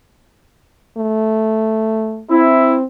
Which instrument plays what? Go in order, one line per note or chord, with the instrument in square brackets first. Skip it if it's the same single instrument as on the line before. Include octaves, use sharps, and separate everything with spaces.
[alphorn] A3
[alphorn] C4 [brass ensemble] E4